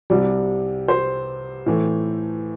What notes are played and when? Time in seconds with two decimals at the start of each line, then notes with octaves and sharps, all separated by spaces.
0.10 C2 C3 G3
0.88 C5
1.66 A2 E3 A3